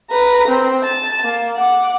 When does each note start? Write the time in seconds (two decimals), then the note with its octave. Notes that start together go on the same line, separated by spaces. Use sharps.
0.11 B4 A#5
0.48 C4
0.84 A5
1.24 A#3
1.56 F#5 D6